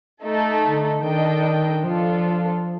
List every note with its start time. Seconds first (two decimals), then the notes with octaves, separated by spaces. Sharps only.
0.22 A3 D#4 A4
0.63 D3
1.03 D#3 D4 A4 D#5 G5
1.84 F3 D4 F4 A4